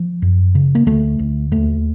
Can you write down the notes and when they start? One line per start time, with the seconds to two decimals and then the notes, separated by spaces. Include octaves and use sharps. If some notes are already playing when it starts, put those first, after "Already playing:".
Already playing: F3
0.22 F#2
0.55 C#3
0.75 A#3
0.87 D2 A3
1.19 D2
1.52 D#2 A3